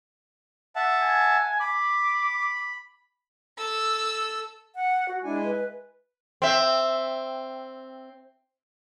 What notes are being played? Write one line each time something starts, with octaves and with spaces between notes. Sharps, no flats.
E5 F#5 A5
G#5
B5 D6
A4 E6
F#5
F#4
G#3 D4 E4 G#5
B4
C4 E5